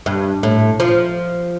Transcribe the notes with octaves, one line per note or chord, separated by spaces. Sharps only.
G2
A2
F3